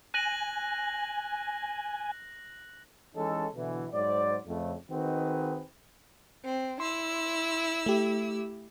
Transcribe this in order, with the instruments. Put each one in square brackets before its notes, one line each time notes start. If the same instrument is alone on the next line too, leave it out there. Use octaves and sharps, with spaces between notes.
[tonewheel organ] G#5 [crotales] F#6 A#6 F#7
[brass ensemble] E3 G#3 C#4 D#4 A4
B2 D3 E3
G#2 F#3 C5 D5
F2 C#3 A3
D#3 C4 D#4 F#4 G#4 B4
[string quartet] C4
[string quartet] E4 E6 [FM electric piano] C6
[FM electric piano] A3 G4